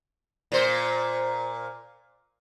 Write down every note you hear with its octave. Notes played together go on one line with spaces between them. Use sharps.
A#2 C5